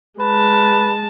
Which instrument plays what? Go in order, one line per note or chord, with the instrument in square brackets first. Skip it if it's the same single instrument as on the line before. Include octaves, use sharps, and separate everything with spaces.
[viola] G#3 A5 [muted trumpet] B4